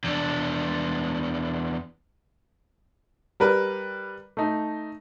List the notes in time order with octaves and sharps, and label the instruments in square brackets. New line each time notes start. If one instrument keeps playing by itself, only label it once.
[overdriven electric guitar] E2 D4
[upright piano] G3 A#4 B4
A3 D#4